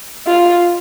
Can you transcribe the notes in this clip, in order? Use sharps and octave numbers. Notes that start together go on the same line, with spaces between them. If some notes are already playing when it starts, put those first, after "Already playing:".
F4